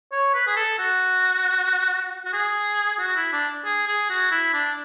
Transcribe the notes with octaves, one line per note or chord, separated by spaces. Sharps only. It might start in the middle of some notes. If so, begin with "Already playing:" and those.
C#5
B4
G#4
A4
F#4
F#4
G#4
F#4
E4
D4
G#4
G#4
F#4
E4
D4